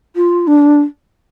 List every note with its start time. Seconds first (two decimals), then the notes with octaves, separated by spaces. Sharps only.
0.16 F4
0.47 D4